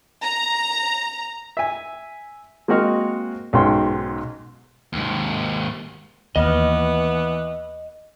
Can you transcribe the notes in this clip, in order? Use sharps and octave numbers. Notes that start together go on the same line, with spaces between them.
A#5
E5 G#5
G#3 A#3 C4 F#4 D#5 F6
B1 G#2 C#4 F#4 G5 C6
D#2 G#2
D#2 E3 B3 D#5 F6